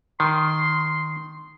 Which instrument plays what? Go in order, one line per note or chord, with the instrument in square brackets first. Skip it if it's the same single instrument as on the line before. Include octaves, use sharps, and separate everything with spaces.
[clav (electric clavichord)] D#3 [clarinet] C6